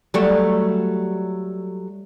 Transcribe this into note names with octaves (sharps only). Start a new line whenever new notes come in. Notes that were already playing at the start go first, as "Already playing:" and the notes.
F#3 G3 A3